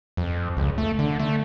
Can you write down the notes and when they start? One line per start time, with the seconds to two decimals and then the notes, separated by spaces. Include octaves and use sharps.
0.17 F2
0.57 C#2
0.78 A3
0.99 D3
1.20 A3